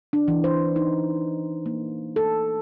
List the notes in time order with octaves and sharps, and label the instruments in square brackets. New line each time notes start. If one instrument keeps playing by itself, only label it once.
[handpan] D4
E3
C5
D#4
A#3
A4